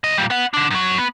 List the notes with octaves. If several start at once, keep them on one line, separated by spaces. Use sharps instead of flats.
C2 D#5
A#2 G3
B3 F#5
D3 D4
F#2 F#3
B3